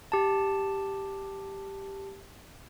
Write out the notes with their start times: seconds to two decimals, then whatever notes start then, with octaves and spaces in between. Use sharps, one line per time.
0.12 G4 A5